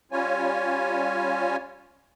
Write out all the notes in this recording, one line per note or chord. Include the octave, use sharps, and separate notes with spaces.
G3 C#4 F4 C#5 G#5